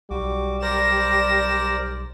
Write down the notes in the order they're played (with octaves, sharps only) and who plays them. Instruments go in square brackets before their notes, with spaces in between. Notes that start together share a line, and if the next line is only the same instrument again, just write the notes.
[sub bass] B1 [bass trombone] G3 [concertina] F#4 D6
[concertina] A#4 C5 D5 [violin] A#6 E7